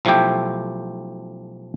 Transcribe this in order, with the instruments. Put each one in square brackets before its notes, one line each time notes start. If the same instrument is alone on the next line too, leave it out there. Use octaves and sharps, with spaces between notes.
[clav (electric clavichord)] B1 F3 A3 E4 G4 G5